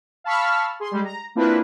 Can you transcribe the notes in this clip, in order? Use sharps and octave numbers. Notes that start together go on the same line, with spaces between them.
F5 A5 B5 C#6 E6 F6
G#4 C6
G3 G#3
A#5
A#3 C4 D4 E4 F4 B4